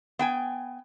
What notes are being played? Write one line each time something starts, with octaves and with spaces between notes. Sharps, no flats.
B3 G5 G#5